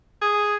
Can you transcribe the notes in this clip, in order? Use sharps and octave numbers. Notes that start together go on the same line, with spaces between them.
G#4